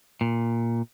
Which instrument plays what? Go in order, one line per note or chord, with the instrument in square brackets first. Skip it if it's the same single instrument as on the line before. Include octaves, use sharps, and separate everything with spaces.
[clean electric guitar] A#2